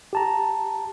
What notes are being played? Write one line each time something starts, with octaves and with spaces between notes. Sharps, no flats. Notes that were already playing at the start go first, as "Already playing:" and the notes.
G4 A5 A#5